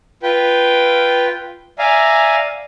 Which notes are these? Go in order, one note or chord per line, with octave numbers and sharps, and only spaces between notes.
F4 B4 G5
D5 E5 F5 G#5 A#5